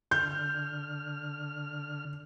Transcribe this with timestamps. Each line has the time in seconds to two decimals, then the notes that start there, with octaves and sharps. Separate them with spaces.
0.11 D3 F6 G6